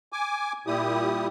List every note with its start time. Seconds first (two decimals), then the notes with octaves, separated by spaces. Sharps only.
0.13 G#5 D6
0.67 A#2 G3 E4 G4 D#6